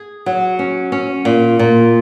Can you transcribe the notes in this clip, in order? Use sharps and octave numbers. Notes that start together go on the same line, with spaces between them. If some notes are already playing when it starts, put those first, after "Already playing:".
Already playing: G#4
F#3
C#4
C#4
A#2
A#2